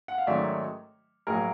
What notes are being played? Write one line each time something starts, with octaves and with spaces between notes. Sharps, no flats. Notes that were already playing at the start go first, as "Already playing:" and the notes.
F#5
F5
G#2 D#3 F#3 A3 C#4 D5 E5
A#1 A2 F#3 A#3 G#4 A#4